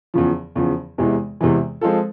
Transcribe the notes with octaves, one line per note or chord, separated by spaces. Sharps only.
E2 C#3 F3
E2 C#3 F3
E2 C3 E3 G#3
E2 C3 E3 G#3
F3 G#3 C4 F4 A4